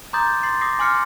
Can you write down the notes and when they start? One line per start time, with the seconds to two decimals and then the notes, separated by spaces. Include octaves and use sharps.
0.13 A#5 C6 D6 D#6 G6 A6
0.43 C6 A6 C7
0.61 D6 D#6 A#6 C7
0.79 G#5 C6 D6 F6 C7 C#7